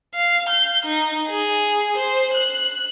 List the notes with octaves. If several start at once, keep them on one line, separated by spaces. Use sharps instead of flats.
F5
G6
D#4
G#4
C5
F#6